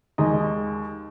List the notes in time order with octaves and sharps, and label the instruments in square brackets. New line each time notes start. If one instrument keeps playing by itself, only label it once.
[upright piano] D#2 D#3 G#3 D#5